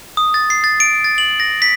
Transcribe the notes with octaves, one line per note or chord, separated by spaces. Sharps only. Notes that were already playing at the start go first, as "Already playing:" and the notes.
D#6
A6
C7
A6
D7
A6
F#7
A#6
B6